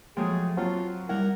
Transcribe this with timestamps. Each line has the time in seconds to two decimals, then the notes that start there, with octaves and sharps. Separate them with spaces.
0.17 F3 F#3 G#3 A3 G#4 G5
0.57 F#3 C4 F4 F#5 A5
1.09 G3 E4 A#4 F#5